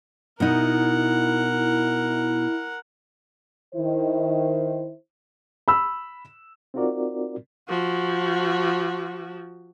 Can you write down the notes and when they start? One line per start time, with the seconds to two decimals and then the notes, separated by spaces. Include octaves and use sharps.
0.40 B2 D#4 E4 A#4 F#5
3.75 D#3 E4 C5
5.68 B5 E6
6.74 C4 D#4 F4 F#4 A#4 D5
7.68 F3 F#4